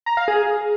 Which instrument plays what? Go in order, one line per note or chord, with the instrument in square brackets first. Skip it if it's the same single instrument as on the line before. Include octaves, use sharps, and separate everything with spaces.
[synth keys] A#5
F5
G#4